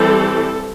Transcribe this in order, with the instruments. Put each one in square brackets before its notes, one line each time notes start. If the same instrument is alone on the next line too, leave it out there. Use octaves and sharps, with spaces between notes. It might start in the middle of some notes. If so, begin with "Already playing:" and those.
Already playing: [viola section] E3 G3 C4 A4